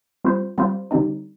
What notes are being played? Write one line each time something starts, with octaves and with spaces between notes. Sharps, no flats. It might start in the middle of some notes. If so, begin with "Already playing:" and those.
G3 C4 F4 C5
G3 C4 F4 C5
D3 G3 C4 D#4